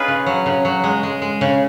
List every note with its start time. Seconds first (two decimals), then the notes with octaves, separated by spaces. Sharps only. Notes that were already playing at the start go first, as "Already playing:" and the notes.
Already playing: C#4 D#4 F4 G#4 B4
0.08 C#3
0.26 F#3
0.46 C#3
0.65 F#3
0.84 G#3
1.03 G#3
1.22 G#3
1.41 C#3